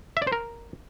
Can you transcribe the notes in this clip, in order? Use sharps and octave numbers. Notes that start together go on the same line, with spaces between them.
E5
D5
C5
A#4